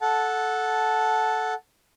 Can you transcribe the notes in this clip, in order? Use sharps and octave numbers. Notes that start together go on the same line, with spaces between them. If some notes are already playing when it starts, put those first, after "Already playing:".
A4 F#5 A5